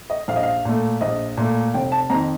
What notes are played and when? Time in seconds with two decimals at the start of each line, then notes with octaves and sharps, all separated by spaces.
0.10 D#5
0.28 A#1 F5
0.36 D#5
0.43 F5
0.65 A#2 A3
1.01 A#1 D#5
1.37 A#2 A3
1.74 F1 G5
1.92 A5
2.10 F2 D#3 A#5